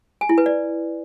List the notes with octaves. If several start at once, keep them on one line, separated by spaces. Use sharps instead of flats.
G#5
E4
B4
D5